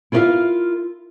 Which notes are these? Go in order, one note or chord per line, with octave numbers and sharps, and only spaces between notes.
E4 F4 A#4 D5 E5 F5